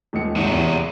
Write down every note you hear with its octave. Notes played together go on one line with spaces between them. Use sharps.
D#1 C#2 C#7
G#1 C3 F#3
E2